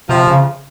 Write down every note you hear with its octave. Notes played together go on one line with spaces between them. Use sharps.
C3 F3
C#3